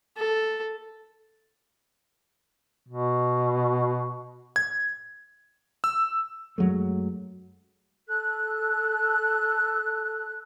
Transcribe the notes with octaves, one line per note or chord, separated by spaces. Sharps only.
A4
B2
G#6
E6
F#2 F#3 G#3 A3
A4 F#6